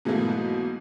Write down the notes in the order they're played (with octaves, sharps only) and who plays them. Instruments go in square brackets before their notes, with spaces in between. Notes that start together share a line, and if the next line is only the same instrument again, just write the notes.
[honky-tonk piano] G#2 B2 E3 F#3 A3 A#3